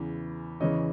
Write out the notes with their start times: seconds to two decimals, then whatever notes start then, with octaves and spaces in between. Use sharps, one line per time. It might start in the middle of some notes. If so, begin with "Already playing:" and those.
Already playing: E2 C#3 E3
0.60 E2 C#3 E3 C#5 D#5